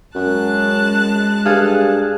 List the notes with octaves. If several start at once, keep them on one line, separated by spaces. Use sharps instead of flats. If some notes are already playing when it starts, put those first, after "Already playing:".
F#2 G#3 A5 F#6
G2 G#4 A4 F5